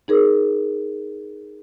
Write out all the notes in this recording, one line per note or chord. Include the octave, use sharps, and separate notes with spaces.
D#4 G#4 A#4